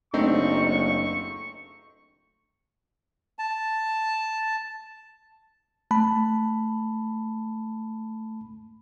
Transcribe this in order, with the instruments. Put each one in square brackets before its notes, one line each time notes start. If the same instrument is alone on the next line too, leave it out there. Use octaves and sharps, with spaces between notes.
[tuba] F#1 [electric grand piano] A3 C4 D#4 [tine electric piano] D4 D#5 [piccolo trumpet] C#6
[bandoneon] A5
[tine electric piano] A3 A5 B5